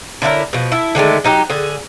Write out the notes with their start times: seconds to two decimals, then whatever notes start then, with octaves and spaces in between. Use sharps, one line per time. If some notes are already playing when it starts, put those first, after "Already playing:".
0.22 D3 C#4 E4 A#4
0.53 B2 F3
0.72 E4 A4
0.95 D3 D#3 G#3 A3
1.24 F#3 D#4 G4
1.50 D3 G#4